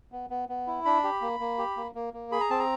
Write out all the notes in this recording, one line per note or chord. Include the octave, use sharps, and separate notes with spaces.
B3
B3
B3
E4
D4 B5
G4
A#3
A#3
G4
A#3
A#3
A#3
G#4 B5
A#5
C4 A5
A#5